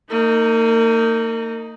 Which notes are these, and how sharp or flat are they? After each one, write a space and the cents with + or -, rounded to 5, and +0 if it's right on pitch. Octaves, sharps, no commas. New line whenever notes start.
A#3 -35 D#4 +5